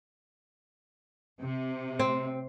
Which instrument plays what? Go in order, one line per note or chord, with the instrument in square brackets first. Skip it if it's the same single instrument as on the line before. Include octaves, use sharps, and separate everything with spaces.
[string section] C3
[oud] C4